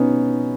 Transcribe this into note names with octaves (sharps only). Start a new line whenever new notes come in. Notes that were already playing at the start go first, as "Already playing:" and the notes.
Already playing: B2 B3 C#4 D#4